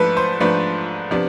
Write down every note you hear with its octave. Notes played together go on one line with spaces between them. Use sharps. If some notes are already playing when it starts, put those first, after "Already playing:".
Already playing: G#2 F3 A3 D4 A4 B4
C5
G#2 F3 A3 D4 B4
C3 F3 B3 D4